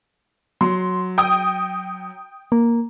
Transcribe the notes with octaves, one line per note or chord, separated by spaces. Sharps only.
F#3 C6
G5 D#6
A#3